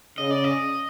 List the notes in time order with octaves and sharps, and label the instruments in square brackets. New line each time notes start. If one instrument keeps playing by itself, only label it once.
[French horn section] C#3 [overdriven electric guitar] D#5
[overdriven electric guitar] D5
D#5